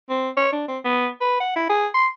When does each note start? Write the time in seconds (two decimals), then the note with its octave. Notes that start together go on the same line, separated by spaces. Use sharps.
0.10 C4
0.37 C#5
0.53 D4
0.68 C4
0.85 B3
1.21 B4
1.40 F#5
1.56 E4
1.69 G#4
1.94 C6